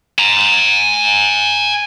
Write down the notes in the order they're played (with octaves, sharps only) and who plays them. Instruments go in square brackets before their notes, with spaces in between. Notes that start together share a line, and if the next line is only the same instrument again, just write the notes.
[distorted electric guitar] G#5 A#5